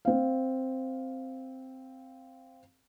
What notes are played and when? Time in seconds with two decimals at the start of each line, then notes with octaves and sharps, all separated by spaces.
0.05 C4 F5